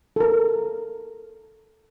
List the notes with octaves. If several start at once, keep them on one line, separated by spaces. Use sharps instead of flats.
A4 A#4